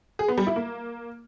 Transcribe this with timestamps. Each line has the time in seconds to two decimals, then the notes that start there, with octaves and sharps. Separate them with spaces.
0.19 G#4
0.28 B3
0.38 G3
0.47 E4
0.56 A#3